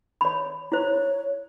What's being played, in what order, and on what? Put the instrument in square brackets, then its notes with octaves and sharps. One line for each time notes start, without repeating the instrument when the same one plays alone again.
[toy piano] C#5 B5
[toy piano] E4 C5 [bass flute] C#5